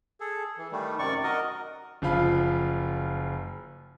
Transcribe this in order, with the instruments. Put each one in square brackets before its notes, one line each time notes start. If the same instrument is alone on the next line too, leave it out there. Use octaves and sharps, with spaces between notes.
[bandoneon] G#4 A4
E3
D#3 G3 A3
F#2 C3 D#3 D5 C#6
F#4 A#4 D#5
[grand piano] F#1 F3 F4 F5 B5